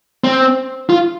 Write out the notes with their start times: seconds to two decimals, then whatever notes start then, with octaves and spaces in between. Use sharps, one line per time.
0.24 C4
0.90 F4